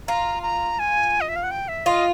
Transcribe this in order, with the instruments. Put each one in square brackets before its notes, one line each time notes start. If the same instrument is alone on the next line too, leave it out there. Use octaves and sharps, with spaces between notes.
[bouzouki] F4 [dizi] A#5
[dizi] A#5
G#5
D#5
E5
F5
F#5
G5
E5
[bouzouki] F4 [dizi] D#5